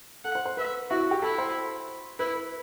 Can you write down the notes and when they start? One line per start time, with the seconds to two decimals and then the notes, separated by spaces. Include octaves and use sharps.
0.24 A4 F#5
0.35 C5
0.45 C5
0.57 B4 E5
0.90 E4 F#4
1.01 F#4
1.11 G4
1.22 E4 A4
1.38 C5
2.19 E4 B4
2.36 B4